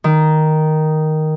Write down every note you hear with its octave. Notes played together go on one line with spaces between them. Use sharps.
D#3